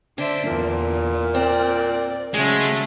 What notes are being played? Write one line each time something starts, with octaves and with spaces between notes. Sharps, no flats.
D3 D4 C5 E5
E2 A#2
C4 D5
C#3 F#3 G#3 A3 G#4